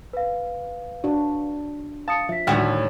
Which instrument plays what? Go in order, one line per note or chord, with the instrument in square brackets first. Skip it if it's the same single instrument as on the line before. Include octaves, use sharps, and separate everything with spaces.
[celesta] B4 F5
[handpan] D4 F#4
[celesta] F5 D#6 C#7 [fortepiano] A5
[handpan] F3 [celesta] E5 B6
[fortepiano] D2 [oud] A2 F#4 [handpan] D#3